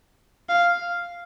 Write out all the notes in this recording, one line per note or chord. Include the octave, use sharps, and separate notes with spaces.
F5